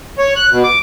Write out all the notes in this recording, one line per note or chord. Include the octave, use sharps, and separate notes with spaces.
C#5
F#6
B2
D6